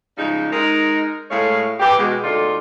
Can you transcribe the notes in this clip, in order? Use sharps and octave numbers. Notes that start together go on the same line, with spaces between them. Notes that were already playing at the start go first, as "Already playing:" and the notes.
C#3 F3 G3 G#3 D#4
G#3 D#4 A#4
A2 G#3 A3 C#5 F5
E3 G4
B2 G#3
D2 C3 D#4 F4 A4 D5